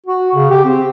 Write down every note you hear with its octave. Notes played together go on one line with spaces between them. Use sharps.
F#4
C#3
G4
C4